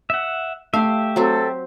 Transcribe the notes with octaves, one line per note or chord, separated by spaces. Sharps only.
E5 F#5
A3 G4 E5 F5
F#3 C4 A4